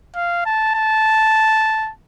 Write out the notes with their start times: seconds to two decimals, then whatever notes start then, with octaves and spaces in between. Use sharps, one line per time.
0.16 F5
0.46 A5
0.75 A5